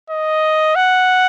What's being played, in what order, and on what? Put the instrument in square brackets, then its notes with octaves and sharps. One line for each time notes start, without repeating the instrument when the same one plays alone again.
[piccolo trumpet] D#5
F#5